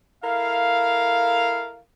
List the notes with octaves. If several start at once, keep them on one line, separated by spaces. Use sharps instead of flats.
E4 A4 A#4 F5